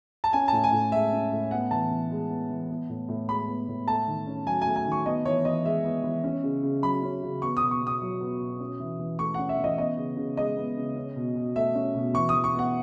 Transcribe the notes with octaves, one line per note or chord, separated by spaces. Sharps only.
A5
C#4 G#5
A2 A5
G#5
A2
G#3 E5
C#4
A2
B3 F#5
E3 A5
E3
G#3
B3
E3
B3
A2
A2
G#3 B5
B3
A2
A3 A5
D#3
C#4
F#3 G#5
G#5
A3
G#5
D#3
C#6
B3 D#5
E3 C#5
E3 D#5
G#3 E5
B3
E3
C#4
C#3
C#3
F#3 B5
C#4
C#3
B3 C#6
B2 D#6
C#6
B2
D#6
F#3
B3
B2
C#4
E3
E3
A3 C#6
C#4 F#5
E5
E3
D#5
B3 D#5
C#3
C#3
G#3 D#5
B3
C#3
C#4
B2
B2
A3 E5
C#4
B2
E3 C#6
E3 D#6
C#6
B3
F#5